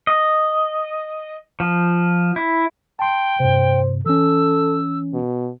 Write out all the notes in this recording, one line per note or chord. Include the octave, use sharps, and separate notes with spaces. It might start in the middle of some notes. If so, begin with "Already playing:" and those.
D#5
F3
E4
G5 A5 C6
G2 C3 C5
E3 C#4 A4 E6
B2